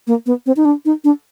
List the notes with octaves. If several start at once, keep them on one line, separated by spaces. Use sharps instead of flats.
A#3
B3
C4
D#4
D4
D#4
D4